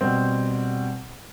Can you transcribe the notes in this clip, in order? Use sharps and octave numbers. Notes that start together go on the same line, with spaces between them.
B2 G3 C4